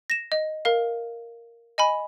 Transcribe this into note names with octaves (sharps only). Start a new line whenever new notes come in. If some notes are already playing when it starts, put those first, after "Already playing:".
A#6 E7
D#5
A#4 F5
D#5 G#5 B5